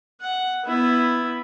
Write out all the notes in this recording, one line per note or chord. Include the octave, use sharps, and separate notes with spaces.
F#5
B3 E4